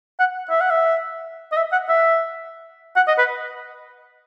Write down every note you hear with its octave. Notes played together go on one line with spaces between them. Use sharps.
F#5
E5
F#5
E5
D#5
E5
F#5
E5
F#5
D#5
B4